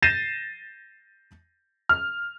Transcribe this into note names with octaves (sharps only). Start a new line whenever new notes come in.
G6 A6 A#6 C7 D#7 E7
F6